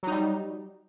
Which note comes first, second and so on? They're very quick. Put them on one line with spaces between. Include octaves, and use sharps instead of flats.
F#3 D#4 G3